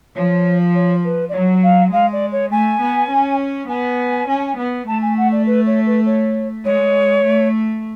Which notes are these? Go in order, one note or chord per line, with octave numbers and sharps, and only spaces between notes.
F3 C#5
C#5
B4
D5
F#3 C#5
F5
G#3 F5
D5
C#5
A3 G#5
B3
C#4
B3 G#5
C#4
B3
A3 A5
G#5
F#5
D5
B4
C#5
B4
C#5
G#3 C#5
A3